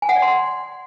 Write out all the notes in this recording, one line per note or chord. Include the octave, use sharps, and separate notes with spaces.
G#5
F#5
D5
C6